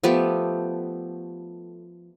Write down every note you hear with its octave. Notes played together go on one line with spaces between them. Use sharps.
F3 A3 B3 G4